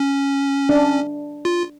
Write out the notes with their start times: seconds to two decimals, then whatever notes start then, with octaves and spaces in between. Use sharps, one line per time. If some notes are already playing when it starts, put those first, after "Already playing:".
Already playing: C#4
0.69 D4
1.45 F4